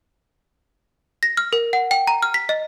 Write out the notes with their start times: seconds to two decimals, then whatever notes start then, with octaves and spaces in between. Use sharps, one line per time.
1.23 A#6
1.37 F6
1.53 A#4
1.73 F#5
1.91 G5
2.07 A#5
2.22 F6
2.34 B6
2.49 D#5